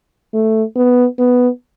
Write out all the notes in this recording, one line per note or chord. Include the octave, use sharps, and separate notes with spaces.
A3
B3
B3